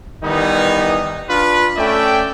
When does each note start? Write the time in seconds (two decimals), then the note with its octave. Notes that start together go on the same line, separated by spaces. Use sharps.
0.23 D#3 E3 G3 B3 D#4
1.29 D4 F4 B4
1.77 A3 C#4 A4 D5 E5 G5